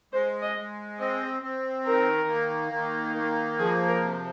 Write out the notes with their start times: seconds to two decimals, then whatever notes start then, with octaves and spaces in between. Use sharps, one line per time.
0.13 G#3 C5
0.42 D#5
0.57 G#3
0.99 C4 D#5
1.42 C4
1.85 D#3 A#4
2.28 A#3
2.72 D#3
3.16 A#3
3.59 F3 G#4
3.87 A#4
4.02 C3